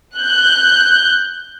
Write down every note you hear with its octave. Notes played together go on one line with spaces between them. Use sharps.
F#6 G6